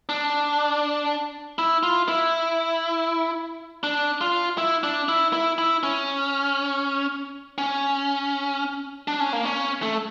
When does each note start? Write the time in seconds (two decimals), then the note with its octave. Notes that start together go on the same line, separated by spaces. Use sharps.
0.09 D4
1.59 E4
1.83 F4
2.08 E4
3.84 D4
4.21 F4
4.58 E4
4.83 D4
5.09 E4
5.33 E4
5.58 E4
5.83 C#4
7.58 C#4
9.08 D4
9.20 C#4
9.33 A#3
9.45 C#4
9.83 A3